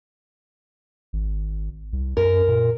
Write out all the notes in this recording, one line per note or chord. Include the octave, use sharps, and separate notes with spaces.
G#1
C2
F#2 A#4
A#2